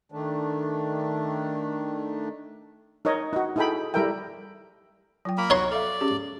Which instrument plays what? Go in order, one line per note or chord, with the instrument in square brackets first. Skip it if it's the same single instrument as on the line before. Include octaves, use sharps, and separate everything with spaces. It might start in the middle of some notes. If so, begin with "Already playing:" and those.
[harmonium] D#3 A3 D4
[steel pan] D#4 A#4 C#5 D#5
D#4 F#4
D#4 E4 G#4 A4 G5 B5
G3 E4 A4 A#4 E5 G5
[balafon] F#3 F4 G5
[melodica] A#3 A#4 B5
[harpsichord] D#4 C#5 C6 [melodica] F#4
[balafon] A4 E5 F5 [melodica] D5
[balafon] C#4 G4 G#4